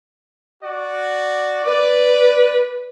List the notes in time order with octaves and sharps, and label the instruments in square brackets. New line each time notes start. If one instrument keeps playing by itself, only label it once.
[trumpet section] F#4 D5
[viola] B4 [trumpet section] D5